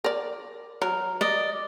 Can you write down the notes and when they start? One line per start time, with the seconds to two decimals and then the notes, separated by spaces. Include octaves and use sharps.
0.04 A#4 D5
0.82 F#3 A#4
1.21 D5 D#5